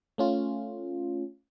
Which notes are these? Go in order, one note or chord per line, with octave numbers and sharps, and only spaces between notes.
A3 C#4 F4